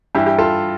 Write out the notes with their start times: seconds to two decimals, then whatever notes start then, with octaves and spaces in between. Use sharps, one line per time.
0.15 G2 E3 E4 G4
0.26 E4 G4
0.38 F4 A4